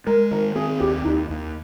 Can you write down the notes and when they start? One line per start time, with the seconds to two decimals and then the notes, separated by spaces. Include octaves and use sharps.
0.06 G#3 A#4
0.31 D#3 A#4
0.56 C4 G#4
0.80 D#2 G4
1.05 D#2 D#4
1.30 D#2